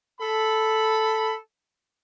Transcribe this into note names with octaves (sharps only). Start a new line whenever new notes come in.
A4 B5